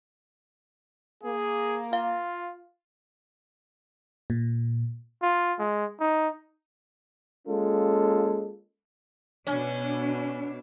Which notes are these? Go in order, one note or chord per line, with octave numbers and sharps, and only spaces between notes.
A#3 G#4
F4 F5
A#2
F4
G#3
D#4
G#3 A#3 C#4 F4 A4
B2 C#4 D4